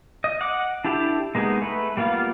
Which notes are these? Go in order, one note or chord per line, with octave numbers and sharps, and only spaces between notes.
D#5
F#5 D6
D4 E4 G4 A4
G#3 A#3 B3 D#4 G#4
A3 B4
G3 A#3 B3 F4